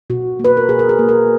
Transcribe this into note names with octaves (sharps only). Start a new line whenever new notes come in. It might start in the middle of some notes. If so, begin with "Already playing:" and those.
B2 F#4
A#3
B4
A#4
B2 G#4
A#4
G#4
A#3
A#4